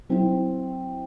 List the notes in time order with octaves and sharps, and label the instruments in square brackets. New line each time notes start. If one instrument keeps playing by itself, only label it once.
[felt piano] F#3 C4 E4